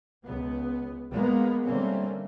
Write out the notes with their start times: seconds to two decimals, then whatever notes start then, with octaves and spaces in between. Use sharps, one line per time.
0.24 C#2 B3
1.12 G#3 A#3 B3
1.66 D3 G3 A3 A#3 C4 C#4